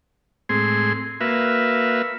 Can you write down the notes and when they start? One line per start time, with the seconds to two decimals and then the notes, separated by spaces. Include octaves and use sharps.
0.49 A2 G#3 C4 G#4 C6
1.21 A#3 F#4 B4 E5 F5